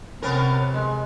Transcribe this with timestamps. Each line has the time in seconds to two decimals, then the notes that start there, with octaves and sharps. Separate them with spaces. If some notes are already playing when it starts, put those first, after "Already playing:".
0.22 C3 B3 C#4 A#4
0.74 G#3